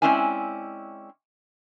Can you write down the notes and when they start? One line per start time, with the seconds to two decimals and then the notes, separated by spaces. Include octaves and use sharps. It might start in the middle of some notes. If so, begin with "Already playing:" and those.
0.02 G#3 C4 C#4 E4 D5 G#5